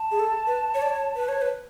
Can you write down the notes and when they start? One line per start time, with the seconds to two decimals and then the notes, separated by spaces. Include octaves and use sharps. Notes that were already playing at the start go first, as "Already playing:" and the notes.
Already playing: A5
0.11 G#4
0.19 A4
0.47 B4
0.74 C#5
0.82 D5
0.89 C#5
1.15 B4
1.28 C#5
1.41 B4